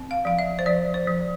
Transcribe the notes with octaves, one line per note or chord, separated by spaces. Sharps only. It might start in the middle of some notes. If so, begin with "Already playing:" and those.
Already playing: C4
F5
F3 F5
E5
C5
F3 D5
C5
F3